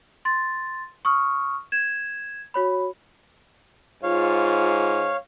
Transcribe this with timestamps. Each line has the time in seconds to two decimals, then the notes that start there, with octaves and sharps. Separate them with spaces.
0.25 C6 A6
1.05 C#6 D#6 F6
1.72 G#6 E7
2.54 F#4 C#5 B5
4.03 G#2 F4 C#5 F5